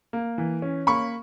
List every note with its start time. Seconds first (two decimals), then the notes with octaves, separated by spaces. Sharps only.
0.13 A#3
0.38 E3
0.62 C#4
0.87 A#3 B5 C#6